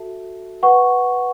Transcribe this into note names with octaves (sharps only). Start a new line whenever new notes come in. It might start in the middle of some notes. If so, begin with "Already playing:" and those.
Already playing: F#4 A4 E5 A5
B4 F#5 C#6